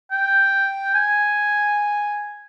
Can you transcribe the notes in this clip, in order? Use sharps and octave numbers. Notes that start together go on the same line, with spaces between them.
G5
G#5